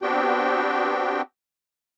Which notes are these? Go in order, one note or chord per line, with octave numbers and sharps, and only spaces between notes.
B3 C4 D4 F#4 G4 G5